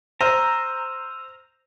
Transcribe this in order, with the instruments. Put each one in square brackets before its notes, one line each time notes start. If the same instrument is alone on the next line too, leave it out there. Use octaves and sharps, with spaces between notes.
[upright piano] C5 [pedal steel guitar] A#5 [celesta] E6 F6 D#7